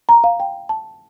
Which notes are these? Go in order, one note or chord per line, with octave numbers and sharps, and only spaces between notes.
A#5
F5
G5
A5